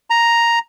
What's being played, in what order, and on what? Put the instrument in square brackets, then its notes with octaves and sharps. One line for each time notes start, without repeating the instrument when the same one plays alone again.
[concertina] A#5